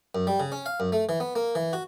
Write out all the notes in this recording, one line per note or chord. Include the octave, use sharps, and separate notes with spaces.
F#2
G3
C#3
C#4
F5
F#2
A3
E3
B3
A#3
E3
F#4